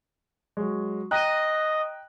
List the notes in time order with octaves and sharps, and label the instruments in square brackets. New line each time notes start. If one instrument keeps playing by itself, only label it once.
[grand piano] F#3 G#3
[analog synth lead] D#5 [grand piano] G5 A#5 F#6